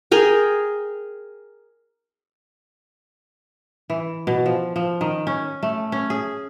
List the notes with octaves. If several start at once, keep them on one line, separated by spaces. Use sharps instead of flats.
G#4 A#4 G5
E3
B2
F3
F3
D#3
C#4
A3
C#4
G#4